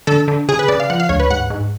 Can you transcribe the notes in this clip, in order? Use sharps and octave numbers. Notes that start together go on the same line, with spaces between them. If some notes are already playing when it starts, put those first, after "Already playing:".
D3 A4
D3
C#3 G#4
B4
C#3 D5
F5
F3 F#5
F5
D2 C#5
B4
G#2 F#5
G#2